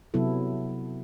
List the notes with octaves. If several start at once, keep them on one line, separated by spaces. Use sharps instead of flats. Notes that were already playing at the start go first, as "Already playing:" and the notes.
C3 F#3 B3 E4 A4